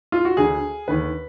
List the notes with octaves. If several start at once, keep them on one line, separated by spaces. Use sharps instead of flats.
F4
F#4
D2 D3 G#4
D#2 D3 B4